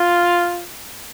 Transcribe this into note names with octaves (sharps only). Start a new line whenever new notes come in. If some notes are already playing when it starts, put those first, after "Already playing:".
Already playing: F4